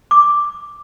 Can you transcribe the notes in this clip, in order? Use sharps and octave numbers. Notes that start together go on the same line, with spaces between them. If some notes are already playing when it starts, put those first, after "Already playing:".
D6